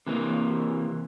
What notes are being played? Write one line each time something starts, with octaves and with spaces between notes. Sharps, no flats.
C3 E3 A#3